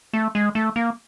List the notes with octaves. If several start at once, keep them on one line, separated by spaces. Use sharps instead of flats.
A3
G#3
A3
A#3